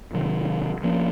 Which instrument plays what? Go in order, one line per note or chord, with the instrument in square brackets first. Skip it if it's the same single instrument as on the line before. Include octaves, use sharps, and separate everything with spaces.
[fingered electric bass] C3 D#3 F#3
F3 A#3 C#4